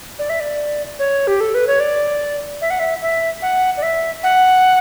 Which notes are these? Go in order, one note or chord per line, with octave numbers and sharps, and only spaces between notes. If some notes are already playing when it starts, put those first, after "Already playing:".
D5
E5
D5
C#5
G4
A4
B4
C#5
D5
E5
F#5
E5
E5
F#5
D5
E5
F#5